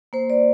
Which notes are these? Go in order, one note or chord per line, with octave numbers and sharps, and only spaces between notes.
A#3 C5
D5